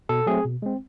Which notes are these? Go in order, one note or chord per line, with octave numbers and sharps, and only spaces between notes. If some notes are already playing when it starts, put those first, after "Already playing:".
B2 A4
F#3 A3 C4 G#4
B2
G#3 C4